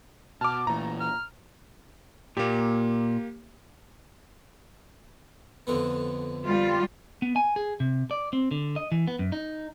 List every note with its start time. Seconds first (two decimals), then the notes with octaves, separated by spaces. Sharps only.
0.41 B2 A5 D6 F6
0.67 A#2 E3 A3 A#5
1.00 F6
2.37 A#2 A#3 G4
5.67 F2 D3 B3
6.46 G3 F4
7.22 B3
7.36 G#5
7.56 G#4
7.80 C3
8.11 D5
8.33 C4
8.51 D3
8.76 D#5
8.92 E3
9.08 B3
9.19 F#2
9.32 D#4